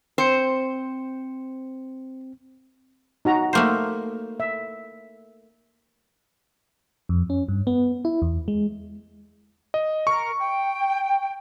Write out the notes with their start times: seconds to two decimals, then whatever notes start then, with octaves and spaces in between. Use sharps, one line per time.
0.18 C4 C5 C#7
3.25 D#4 F#4 A#5
3.53 A3 A#3 C5
4.40 E5
7.09 F2
7.30 C#4
7.48 G2
7.67 B3
8.05 E4
8.22 E2
8.48 G#3
9.74 D#5
10.07 A#4 C#6
10.39 G5